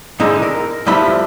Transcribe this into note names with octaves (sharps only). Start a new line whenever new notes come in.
G#2 D3 D#4 E4
A#4
G2 F3 A3 E4 B5 C6